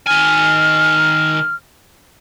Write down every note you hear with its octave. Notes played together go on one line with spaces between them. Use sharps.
D#3 G#5 F6